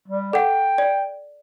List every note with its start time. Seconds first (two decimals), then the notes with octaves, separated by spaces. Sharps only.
0.08 G3
0.33 A4 F#5 G5
0.78 D5